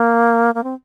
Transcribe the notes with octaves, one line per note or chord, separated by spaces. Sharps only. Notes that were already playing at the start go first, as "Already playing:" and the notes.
Already playing: A#3
A#3
C4